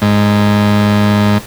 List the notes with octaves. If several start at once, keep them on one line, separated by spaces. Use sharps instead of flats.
G#2